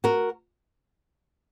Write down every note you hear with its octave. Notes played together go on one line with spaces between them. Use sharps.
F#4 A#4